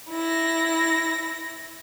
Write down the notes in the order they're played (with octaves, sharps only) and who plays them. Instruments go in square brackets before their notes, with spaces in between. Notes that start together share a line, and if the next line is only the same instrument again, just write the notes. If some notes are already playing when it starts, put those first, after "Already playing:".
[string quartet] E4 A#6